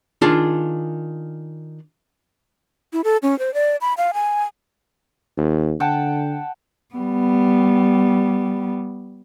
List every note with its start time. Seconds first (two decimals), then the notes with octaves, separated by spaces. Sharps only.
0.22 D#3 D4 F4 G#4 A5
2.93 E4
3.04 A4
3.23 C#4
3.39 C5
3.54 D5
3.81 B5
3.98 F5
4.14 G#5
5.37 D#2
5.80 D3 F#5 G5 A5
6.95 G3 B3